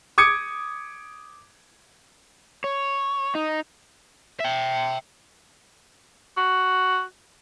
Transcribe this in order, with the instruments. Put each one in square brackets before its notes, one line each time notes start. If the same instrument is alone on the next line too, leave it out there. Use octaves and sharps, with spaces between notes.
[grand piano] D6 D#6 G#6 C#7
[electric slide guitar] C#5
D#4
[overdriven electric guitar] E5 G5
[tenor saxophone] F#4